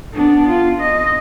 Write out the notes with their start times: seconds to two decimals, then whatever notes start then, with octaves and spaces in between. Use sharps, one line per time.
0.13 B3 D4
0.49 F4
0.81 D#5